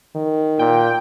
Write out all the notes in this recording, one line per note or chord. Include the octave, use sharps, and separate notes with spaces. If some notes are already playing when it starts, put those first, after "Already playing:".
D#3
A#2 G5